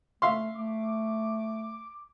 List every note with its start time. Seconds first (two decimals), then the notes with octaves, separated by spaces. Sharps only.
0.22 A3 E5 F5 C6
0.56 A3 D6